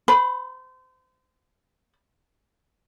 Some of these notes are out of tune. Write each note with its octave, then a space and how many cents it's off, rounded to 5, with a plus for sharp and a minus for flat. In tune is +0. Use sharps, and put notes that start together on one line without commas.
C5 -30 B5 +0